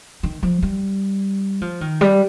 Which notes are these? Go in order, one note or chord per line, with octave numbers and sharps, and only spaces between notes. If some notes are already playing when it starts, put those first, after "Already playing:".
D#3
F3
G3
F3
D#3
G3